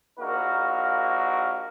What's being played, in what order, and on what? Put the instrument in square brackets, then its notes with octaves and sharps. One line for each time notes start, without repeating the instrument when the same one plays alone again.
[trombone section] A#1 A#3 D#4 F#4 A#4